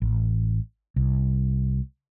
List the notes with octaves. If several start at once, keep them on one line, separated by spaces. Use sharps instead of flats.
A1
C2